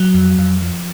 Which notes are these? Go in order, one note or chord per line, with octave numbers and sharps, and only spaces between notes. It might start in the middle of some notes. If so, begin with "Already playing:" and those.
Already playing: F#3
F2
F2
F3